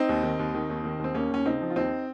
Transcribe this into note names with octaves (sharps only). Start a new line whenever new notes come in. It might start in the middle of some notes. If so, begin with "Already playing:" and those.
Already playing: C4 D#4
D#2
D#3
D#2
D#3
D#2
D#3
D#2 C4
D#2 A#3 C#4
D#2 C#4
C#3 C4 D#4
F3
F4
D#2 C4 D#4